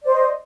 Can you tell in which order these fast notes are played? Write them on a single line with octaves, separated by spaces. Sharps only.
D5 C5 D#5